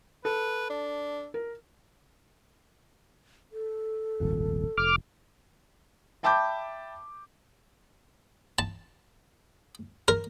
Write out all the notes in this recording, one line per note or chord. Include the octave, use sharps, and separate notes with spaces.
A4 B4
D4
A#4
A4
D#1 G#1 F2
F1 D6 F6
E5 G5 A5 B5 D6 G6
A5
A#4